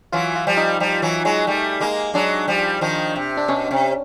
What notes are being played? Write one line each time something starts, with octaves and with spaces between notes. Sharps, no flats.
E3 F#3 F4
F4
F3 G3
D#4
F3 G3
E3 F#3
F#3 G#3
G3 A3
G#3 A#3
F#3 G#3 D4
F3 G3
D#3 F3
C3
D4
B2 C#4
C3